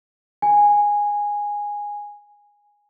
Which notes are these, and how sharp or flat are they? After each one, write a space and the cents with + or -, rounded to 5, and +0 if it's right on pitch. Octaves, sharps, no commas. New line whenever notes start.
G#5 -10